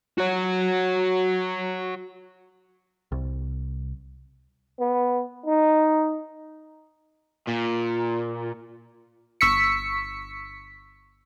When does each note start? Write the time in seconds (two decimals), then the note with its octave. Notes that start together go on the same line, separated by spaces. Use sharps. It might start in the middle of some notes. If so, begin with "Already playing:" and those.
0.18 F#4 C#5
3.12 C2
4.80 B3
5.46 D#4
7.48 A#2
9.41 G1 C#6 E6 B6 C#7